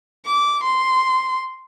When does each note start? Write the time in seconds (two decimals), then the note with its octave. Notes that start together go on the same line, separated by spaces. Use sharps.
0.25 D6
0.64 C6